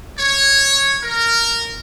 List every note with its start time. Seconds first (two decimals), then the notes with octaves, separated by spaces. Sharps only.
0.18 C#5
1.03 A#4